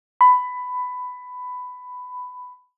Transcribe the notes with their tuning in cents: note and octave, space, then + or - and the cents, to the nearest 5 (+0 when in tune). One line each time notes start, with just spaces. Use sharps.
B5 +15